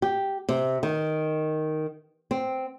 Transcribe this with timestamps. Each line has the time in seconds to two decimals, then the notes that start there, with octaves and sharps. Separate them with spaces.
0.02 G4
0.49 C3
0.83 D#3
2.31 C4